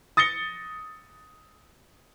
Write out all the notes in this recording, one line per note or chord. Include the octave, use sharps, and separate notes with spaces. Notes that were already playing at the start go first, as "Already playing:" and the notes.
D#6 A6 A#6 C#7 G7